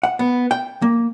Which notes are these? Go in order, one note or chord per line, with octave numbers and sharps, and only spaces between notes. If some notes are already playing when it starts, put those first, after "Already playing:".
F#5
B3
G5
A#3